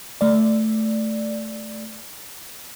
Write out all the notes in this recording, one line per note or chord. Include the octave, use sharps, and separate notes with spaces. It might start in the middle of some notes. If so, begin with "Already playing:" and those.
A3 D5